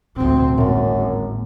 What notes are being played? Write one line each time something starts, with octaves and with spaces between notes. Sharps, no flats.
A1 D2 B2 C4
G#1 F#2 A2 A#3